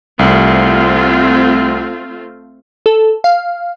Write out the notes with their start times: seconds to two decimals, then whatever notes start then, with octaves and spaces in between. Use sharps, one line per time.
0.19 C2 A3 C4 F4
2.86 A4
3.24 F5